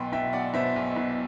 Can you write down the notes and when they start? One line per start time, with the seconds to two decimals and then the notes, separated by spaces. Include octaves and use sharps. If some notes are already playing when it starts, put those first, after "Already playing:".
Already playing: B1 B2 G5 B5 C6
0.12 B2 E5 G5
0.33 B1 D5 F#5
0.54 B2 C5 E5
0.76 B1
0.96 B2